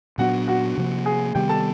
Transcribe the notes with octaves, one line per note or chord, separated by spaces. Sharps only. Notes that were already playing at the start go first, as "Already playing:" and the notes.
A#2 F#3 B3 D4 F#4 F#5
F#4 F#5
C3 F3 A#3
G#4 G#5
C3 D#3 G3 B3 G4 G5
A4 A5